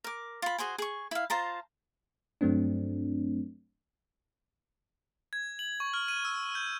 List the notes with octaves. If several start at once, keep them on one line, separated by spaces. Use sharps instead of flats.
A#4 D6
F4 B5
F#4 G#4 C5 G#5
G#4 C#6
E4 F5
F4 C5 A5 A#5
G2 F#3 A3 C4 D4
G#6
F#7
C#6
F6
D#7
E6
G6